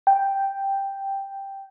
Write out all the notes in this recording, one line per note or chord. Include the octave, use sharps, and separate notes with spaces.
G5